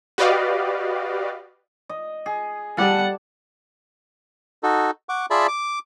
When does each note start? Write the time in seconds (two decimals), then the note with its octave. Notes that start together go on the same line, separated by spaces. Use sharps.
0.18 F#4 G4 B4 D5 D#5 F5
1.89 D#5
2.26 G#4
2.77 G3 A4 D5 F#5 A5
4.63 D#4 F#4 A4
5.09 F#5 C#6 D6
5.30 F4 G#4 D5 E5 A5 B5
5.48 D6